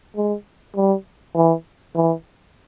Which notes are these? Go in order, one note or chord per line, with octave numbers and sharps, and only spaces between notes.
G#3
G3
E3
E3